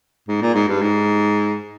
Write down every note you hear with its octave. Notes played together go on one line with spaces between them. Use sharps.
G#2
A#2
G#2
G2
G#2